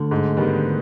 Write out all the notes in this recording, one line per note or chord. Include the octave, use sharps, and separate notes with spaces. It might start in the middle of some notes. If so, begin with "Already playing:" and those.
Already playing: D2 D3
G#2
D#3 G3 B3